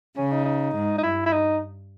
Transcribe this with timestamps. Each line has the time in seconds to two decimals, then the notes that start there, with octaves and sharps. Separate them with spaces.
0.17 C#3 C#4
0.31 D#4
0.45 D#4
0.75 G#2
0.98 D#4
1.03 G2 E4
1.26 E4
1.33 D#4